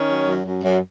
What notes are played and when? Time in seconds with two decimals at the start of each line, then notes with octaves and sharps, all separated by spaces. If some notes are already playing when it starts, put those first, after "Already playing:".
Already playing: D#3 C#4
0.09 F#3
0.27 F#2
0.46 F#2
0.64 F#2